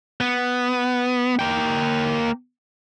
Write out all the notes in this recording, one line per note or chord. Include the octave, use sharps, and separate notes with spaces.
B3
A#3 G5